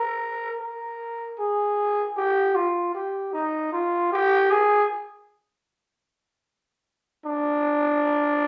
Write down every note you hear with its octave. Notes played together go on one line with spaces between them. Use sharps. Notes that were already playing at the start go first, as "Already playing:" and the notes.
Already playing: A#4
A#4
G#4
G4
F4
G4
D#4
F4
G4
G#4
D4